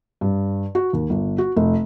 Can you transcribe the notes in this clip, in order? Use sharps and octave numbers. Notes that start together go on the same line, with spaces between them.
G2
F#4
D#2
G1
F#4
F1